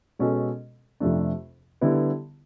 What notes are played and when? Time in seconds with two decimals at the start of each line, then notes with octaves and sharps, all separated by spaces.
0.19 B2 G#3 C#4 F#4 A4
1.00 F2 C3 F3 A3 D4
1.81 D3 G3 B3 E4